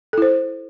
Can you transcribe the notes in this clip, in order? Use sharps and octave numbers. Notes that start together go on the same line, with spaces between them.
E4 A4 C5